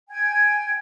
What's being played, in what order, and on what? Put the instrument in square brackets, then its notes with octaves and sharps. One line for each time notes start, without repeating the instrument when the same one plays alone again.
[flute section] G5 G#5 G#6